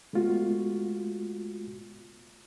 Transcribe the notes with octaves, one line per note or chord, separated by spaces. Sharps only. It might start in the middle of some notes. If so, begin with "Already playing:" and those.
G#3 A3 B3 F4 F#4